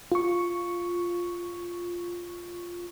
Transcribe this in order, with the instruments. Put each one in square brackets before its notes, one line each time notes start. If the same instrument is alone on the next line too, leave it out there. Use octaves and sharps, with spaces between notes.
[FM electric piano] F4 C#6